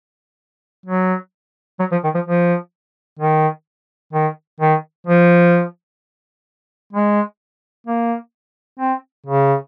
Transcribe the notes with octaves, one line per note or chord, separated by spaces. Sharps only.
F#3
F#3
F3
D#3
F3
F3
D#3
D#3
D#3
F3
G#3
A#3
C4
C#3